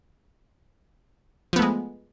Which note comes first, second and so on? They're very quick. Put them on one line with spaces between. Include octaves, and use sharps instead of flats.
F3 B3 A3 G#3